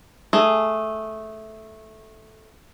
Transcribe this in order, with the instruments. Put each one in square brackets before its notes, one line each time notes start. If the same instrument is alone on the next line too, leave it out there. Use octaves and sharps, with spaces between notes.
[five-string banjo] A3 G#4